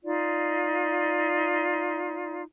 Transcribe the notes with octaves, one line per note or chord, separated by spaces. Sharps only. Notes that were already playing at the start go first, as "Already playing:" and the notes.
D#4 F4 D5